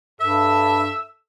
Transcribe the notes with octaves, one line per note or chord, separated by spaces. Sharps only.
G2 A4 E5 E6